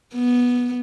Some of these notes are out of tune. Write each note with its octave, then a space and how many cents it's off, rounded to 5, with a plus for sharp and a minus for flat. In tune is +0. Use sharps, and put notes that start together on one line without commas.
B3 -10